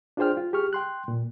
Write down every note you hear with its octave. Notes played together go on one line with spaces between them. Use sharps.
D4 F4 G#4 C5 G5 F6
F4
G4 G#4 C#6 F6
G5 C6 F#6
A#2